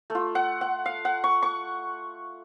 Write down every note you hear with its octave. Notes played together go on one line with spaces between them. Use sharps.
A3
F4
F#5
F#5
F5
F#5
C#6
C#6